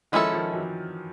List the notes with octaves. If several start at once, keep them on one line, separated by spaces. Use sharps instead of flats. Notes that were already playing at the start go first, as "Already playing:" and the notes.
D#3 F3 G#3 C#4 E4 A4
D#3 F3
E3 F#3